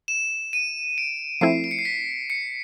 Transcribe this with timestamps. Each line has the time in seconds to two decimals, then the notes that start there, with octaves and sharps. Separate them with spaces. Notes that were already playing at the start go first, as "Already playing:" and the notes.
0.08 E7
0.53 D#7
0.98 D7
1.41 F3 A3 C4 E4 C7
1.64 D7
1.71 C#7
1.79 C7
1.85 B6
2.30 C#7